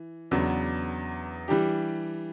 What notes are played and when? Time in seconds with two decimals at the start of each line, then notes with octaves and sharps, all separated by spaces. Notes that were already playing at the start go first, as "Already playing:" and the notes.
Already playing: E3
0.31 E2 C#3 F#3 B3 D4
1.48 E3 G3 D4 G4